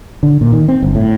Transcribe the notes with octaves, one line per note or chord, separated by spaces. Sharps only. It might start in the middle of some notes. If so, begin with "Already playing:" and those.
D3
A#2
D#3
C4
G1
A2